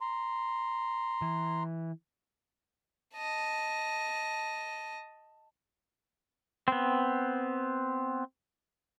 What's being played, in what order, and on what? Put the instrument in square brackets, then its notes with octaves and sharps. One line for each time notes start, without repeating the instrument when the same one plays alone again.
[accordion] A#5 C6
[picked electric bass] E3
[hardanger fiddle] D#5 A5
[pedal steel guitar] B3 C4